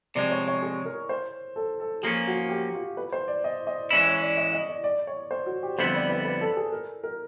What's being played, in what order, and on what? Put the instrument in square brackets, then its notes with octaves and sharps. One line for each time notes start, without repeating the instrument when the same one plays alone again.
[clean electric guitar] C3 F3 G#3 [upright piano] D5
[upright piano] C#5
C#5
G#4
A#4
C5
A4
A4
[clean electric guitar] F3 A#3 C#4 [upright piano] G#4
[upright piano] F#4
G4
F4
B4
C5
D5
D#5
D#5
[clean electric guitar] E3 G#3 C#4 E4 [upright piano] D5
[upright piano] C#5
D5
D#5
D#5
D5
D5
C#5
C5
F#4
G4
[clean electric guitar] F2 D3 G3 B3 E4 [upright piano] C5
[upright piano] D5
B4
B4
A4
G#4
A#4
A#4